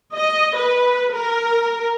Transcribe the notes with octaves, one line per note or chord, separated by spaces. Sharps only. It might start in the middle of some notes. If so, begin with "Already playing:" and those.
D#5
B4
A#4